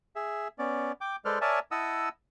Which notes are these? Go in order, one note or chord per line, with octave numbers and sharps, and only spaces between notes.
G#4 E5
B3 C#4 D5
G5 D6
G#3 A4 B4 C5 D5 F6
A#4 C#5 D5 E5 G#5 A5
E4 D#5 F#5 A5 D#6 E6